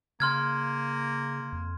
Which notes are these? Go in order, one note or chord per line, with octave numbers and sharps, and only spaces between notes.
C#3 A#3 C6 F6 G#6
F2